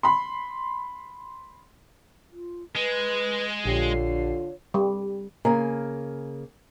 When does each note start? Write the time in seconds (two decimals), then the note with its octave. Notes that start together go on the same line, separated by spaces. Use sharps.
0.03 B5 C6
2.32 F4
2.75 G#3 B4
3.66 A#1 D3 F4 G4 C#5 C7
4.74 G3
5.45 C#3 A#3 G#5